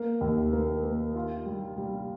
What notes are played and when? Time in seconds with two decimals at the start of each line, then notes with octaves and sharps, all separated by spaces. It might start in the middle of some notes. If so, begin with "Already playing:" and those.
Already playing: A#3
0.21 D#2
0.53 A#3
0.84 A#3
1.15 F4
1.46 G3
1.78 G3